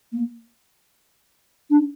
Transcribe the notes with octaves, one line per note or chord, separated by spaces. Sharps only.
A#3
D4